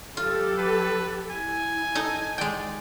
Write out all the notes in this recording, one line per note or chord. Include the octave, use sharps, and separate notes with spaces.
F#3 F4 G4 A4
B4
E4 G#5
D#4 A4
G#3 D5 G5